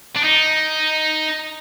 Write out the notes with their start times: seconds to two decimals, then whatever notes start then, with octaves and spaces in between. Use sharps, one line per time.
0.16 D4
0.24 D#4